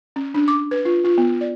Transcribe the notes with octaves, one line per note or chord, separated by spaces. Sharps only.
C#4
D4
D6
B4
F4
F4
B3
D5